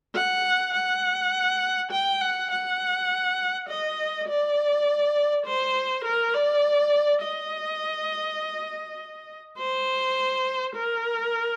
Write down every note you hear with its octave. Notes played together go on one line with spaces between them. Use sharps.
F#5
F#5
G5
F#5
F#5
D#5
D5
C5
A#4
D5
D#5
C5
A#4